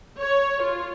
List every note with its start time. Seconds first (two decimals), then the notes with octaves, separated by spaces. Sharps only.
0.19 C#5
0.62 F4